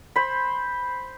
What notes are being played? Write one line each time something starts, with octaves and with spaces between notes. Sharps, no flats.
C5 B5